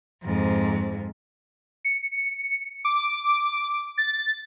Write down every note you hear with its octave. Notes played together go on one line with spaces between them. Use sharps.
F2 G#2
C#7
D6
A6